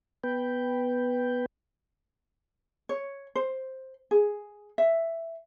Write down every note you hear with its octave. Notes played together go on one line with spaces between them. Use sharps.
B3 B4 G5
C#5
C5
G#4
E5